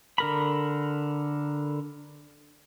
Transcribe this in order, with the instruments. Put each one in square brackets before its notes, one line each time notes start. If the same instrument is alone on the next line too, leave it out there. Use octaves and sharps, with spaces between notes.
[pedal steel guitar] D3 A#4 B5